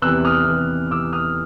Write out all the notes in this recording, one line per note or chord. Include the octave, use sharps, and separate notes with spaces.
E2 C3 E3 E6 F#6
D#6 F6
E2 C3 E3
E2 C3 E3 D6 E6
D#6 F6